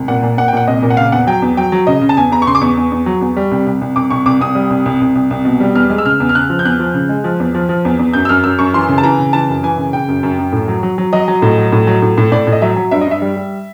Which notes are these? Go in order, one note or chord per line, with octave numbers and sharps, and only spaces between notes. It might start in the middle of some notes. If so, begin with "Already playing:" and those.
Already playing: C2
A#2 F#5
A#2
A#2 F#5
G5
A#2 F#5
C2 D#5
A#2
F#5
C#3 F5
E2 F#5
F#3 G5
E2
F#3 G5
F#3
C#3 D#5
C#3
A5
E2 G#5
E2 A#5
C#6
C#3 C6
D6
E2 C#6
E2
E2
F#3
E2
G3
C2
C2
C2
C2 D6
C2 C#6
C2 D6
C2 D#6
G3
C2
C2
C2
C2
C2
B2
G3
E2 F6
G#3
E6
C#3 F6
E2
F6
C#3 F#6
F3
G6
E2 F#6
F3
C#3
G#3
F3
E2
F3
F3
E2
E2
F#2 G6
E6
F#2 F6
F#2 E6
F#2 C#6
E3 C6
C#3
A5
E3 A#5
C#3
E3 A5
F#2
E3 G#5
C#3
C#3 G5
F#2
F#2
F#2
A2
F#3
F#3
F#3
F#3 D#5
F#3
A2
F#3
A2
F#3
A2
A2
A2 D5
A2
D#5
F#3 E5
F#3
G2 E5
D#5
G2 E5
G3
G3